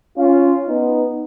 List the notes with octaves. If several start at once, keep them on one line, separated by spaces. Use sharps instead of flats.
C#4 F4
B3 D#4